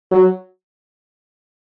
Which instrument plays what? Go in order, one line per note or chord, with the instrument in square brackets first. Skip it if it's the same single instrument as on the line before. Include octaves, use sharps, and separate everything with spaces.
[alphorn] F#3